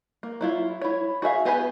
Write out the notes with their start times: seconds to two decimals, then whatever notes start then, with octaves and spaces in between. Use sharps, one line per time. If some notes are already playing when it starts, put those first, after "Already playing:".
0.23 A#3
0.41 F#3 E4 F4
0.82 E4 C#5
1.22 F#4 G#4 E5 F5
1.45 B3 G4 G#4 B4 G#5